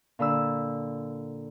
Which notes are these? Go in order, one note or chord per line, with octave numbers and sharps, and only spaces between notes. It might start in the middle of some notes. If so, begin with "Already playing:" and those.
A#2 D3 B5 E6